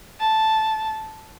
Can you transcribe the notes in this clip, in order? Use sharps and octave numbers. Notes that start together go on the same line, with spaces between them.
A5